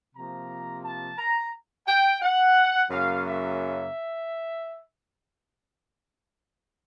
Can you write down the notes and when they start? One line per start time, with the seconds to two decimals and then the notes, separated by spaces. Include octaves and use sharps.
0.15 C3 F3 A#3 A#5
0.84 A5
1.19 A#5
1.87 G5
2.22 F#5
2.91 F#2 C#3 F#3 A#3 F5
3.26 E5